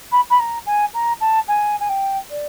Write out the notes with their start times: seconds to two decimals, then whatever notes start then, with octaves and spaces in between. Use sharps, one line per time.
0.12 B5
0.30 B5
0.40 A#5
0.66 G#5
0.94 A#5
1.21 A5
1.48 G#5
1.80 G#5
1.89 G5
2.30 D5